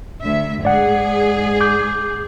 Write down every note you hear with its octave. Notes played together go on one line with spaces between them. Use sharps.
D2 E5
G#2 G#4 D5 F#5
D6 G6